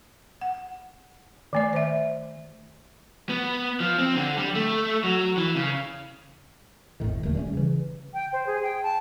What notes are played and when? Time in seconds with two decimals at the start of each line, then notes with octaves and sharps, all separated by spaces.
0.41 F#5
1.53 D#3 A3 D5
1.73 C5 E5
3.29 B3
3.80 F3
3.99 C4
4.16 D3
4.37 G3
4.55 A3
5.04 F#3
5.37 E3
5.55 C#3
7.00 G#1 E2 A2 D#3
7.23 D#1 D3 D#3 A3
7.35 G3 G#3 C#4
7.53 C#3 E3
8.14 G5
8.33 C5
8.47 G#4
8.63 G5
8.83 A5